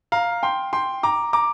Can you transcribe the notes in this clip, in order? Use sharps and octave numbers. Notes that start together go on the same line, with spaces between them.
F5 A#5
G5 C6
G5 C6
A#5 D6
A#5 D6